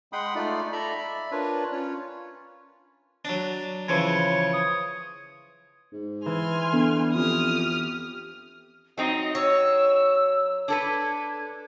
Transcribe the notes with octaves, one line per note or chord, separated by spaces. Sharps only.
G#3 F#5 G5 B5 C6 D#6
A3 D#4 F4 D5
A4 D5 E5 A#5 B5
D5 E5 B5
D4 F4 A#4 B4 C#5
C#4 F4 C#5
F#3 D4
C#3 E3 F3 C#5
D#6
G#2
E3 G#5 C6 F6
D3 B3
F2 G4 D#6 F6
F#3 C4 D#4 D#5
C#5 E6
D4 A4 B4 G#6